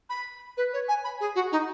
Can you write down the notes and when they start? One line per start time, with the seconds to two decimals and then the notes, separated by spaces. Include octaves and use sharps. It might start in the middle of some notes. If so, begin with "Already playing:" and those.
0.10 B5
0.57 B4
0.73 C#5
0.88 G#5
1.04 B5
1.20 G#4
1.35 F#4
1.52 D#4